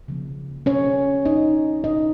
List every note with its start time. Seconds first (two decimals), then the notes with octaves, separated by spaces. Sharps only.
0.08 C#3 F3 A#3
0.66 C#4 C#5
1.25 D#4 D#5
1.84 D#4 D#5